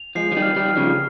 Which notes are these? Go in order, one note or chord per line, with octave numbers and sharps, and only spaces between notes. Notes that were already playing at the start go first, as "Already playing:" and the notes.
Already playing: F7
F3 G#3 C7
F3
D#3 G3
F6
D#3 G3
F6
C#3 F3